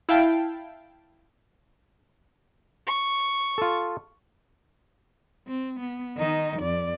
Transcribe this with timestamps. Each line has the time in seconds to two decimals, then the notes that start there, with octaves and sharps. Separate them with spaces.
0.09 E4 F5 G5 A5 D7
2.87 C#6
3.58 F4 A4
5.48 C4
5.80 B3
6.17 D#3 D#4
6.60 F2 D5